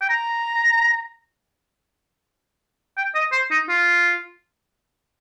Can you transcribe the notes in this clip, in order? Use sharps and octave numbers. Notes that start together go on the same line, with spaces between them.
G5
A#5
G5
D#5
C5
D#4
F4